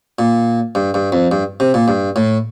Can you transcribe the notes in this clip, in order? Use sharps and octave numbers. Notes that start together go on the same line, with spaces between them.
A#2
G2
G2
F2
G2
C3
A#2
G2
A2